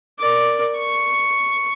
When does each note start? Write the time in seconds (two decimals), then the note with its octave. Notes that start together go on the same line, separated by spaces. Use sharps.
0.20 A#4 D5
0.78 C#6